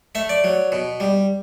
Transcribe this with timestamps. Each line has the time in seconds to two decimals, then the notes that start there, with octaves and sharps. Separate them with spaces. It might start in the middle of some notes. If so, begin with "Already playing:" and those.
0.15 A3 E5
0.29 D5
0.44 F#3
0.72 B2
1.00 G3